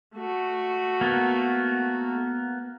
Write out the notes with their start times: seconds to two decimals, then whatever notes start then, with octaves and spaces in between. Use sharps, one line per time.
0.15 A3 F#4
1.01 A#3 B3